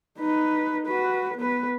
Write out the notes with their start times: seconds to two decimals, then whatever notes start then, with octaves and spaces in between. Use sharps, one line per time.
0.19 D#4 B4
0.86 F#4 B4
1.38 B3 B4